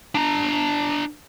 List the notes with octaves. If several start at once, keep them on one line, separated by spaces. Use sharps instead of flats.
D4 A#5